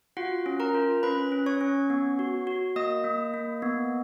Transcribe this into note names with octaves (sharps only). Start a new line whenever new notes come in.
F4 F#4 F#5
C#4
A#4 A#5
F4
C#4 B4 B5
C#4
C#5 C#6
C#4
B3
F#4
F#4
A#3 D#5 D#6
A#3
A#3
B3